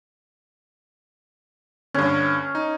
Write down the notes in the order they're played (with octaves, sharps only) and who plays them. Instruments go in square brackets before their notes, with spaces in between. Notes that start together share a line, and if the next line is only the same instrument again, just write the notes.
[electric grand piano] G2 D3 [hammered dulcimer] C#4
[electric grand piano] D#4